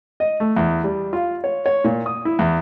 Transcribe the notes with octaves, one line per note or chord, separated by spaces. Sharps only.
D#5
A3
E2
G3
F4
C#5
C#5
A#2
D#6
E4
E2